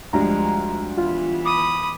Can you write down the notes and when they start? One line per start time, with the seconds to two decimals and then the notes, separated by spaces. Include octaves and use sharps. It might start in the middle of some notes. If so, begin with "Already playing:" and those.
0.13 D2 F3 G3 G#3 A#5
0.97 E3 B3 F4
1.45 B5 D6 D#6